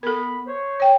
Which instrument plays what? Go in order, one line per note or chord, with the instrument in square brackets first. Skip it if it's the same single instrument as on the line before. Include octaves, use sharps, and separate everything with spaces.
[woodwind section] B3 B5 [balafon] A4 A#4
[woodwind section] C5 C#5
[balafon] C#5 G5